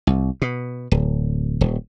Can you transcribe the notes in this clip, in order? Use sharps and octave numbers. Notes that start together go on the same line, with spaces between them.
C2
B2
D1
D#1